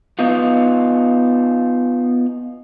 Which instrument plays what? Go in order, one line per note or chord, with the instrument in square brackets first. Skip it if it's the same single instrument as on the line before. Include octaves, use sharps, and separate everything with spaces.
[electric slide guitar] B3 D#4 F4